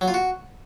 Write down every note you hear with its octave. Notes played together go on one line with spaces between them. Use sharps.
F#3
F4
F#4